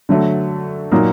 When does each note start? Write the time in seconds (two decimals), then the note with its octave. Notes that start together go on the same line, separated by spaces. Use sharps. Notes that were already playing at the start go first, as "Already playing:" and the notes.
0.09 D3 F#3 A3
0.92 A#2 F#3 A#3 D#4